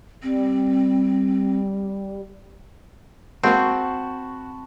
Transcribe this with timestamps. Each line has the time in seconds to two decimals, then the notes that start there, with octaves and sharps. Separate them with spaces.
0.23 G3 C4
3.43 G#3 A#3 C4 F#4 A5 B5 C#6